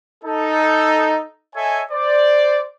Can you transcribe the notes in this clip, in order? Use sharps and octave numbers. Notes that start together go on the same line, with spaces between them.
D#4 A4
A4 C#5 D#5 E5 G#5
C5 D5